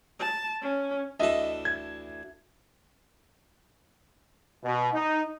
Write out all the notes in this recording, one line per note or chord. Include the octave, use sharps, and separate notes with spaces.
A5
C#4
D2 E3 A4 D#5 E5
G#6
B2
D#4